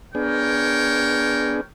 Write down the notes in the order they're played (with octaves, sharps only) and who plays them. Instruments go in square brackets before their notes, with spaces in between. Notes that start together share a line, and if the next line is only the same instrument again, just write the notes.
[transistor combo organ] B3 D4 G#4 [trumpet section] A#4 C#5 G5